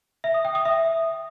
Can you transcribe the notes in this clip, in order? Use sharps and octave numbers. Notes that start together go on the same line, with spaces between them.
E5
D#6
G5
D#6
E5